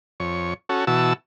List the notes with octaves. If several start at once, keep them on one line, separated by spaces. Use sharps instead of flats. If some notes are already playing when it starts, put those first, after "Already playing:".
F2 C#5
C#4 F#4 A4
B2 E3 F#4 A5 E6